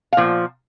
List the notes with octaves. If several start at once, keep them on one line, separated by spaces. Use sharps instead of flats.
F5
A#2 F3